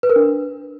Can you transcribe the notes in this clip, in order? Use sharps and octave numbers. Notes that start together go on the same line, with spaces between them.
B4
A#4
D4